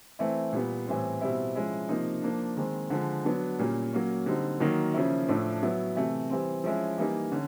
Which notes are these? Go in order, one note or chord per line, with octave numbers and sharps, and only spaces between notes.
E3 A3 C4 E4
A#2 G3 B3
A2 E3 G3 C4
B2 G3 C4 E4
F3 G#3 C#4 E4
C3 F3 A#3 D#4
F3 A#3 D4
D#3 G#3 C4
D3 F3 G#3
F#3 B3 D4
A#2 G3 A#3 C#4
F#3 A#3 C#4
D3 G3 C4 D#4
D#3 F#3 A#3 D#4
C#3 F3 A#3 C#4 E4
A2 F3 A3 D4
F#3 B3 E4
C3 E3 A3
E3 G3 C4
F3 G#3 C#4 E4
E3 G3 A#3 D#4
D3 C#4